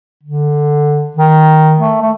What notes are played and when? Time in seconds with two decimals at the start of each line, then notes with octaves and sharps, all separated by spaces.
0.23 D3
1.17 D#3
1.80 A3
2.02 A3